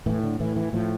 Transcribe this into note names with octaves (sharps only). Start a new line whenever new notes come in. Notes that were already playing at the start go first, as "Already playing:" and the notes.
A2 E3
D3
A2 E3
E3
A2 F3